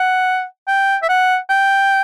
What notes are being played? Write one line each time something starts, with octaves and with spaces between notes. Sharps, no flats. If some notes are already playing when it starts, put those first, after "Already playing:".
Already playing: F#5
G5
E5
F#5
G5